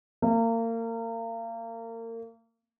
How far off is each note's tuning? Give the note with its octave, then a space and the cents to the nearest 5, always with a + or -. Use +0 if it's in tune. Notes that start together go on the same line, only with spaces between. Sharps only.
A#3 -30